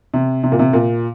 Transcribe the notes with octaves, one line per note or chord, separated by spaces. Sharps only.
C3
C3
A#2
C3
A#2